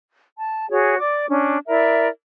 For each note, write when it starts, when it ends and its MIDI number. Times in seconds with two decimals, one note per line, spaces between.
0.38 0.68 81
0.70 0.97 66
0.70 0.97 68
0.70 0.97 73
0.99 1.26 74
0.99 1.26 86
1.28 1.58 61
1.28 1.58 62
1.67 2.08 64
1.67 2.08 70
1.67 2.08 74
1.67 2.08 76